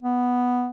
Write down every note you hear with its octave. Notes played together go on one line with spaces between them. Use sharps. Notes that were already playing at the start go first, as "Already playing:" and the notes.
B3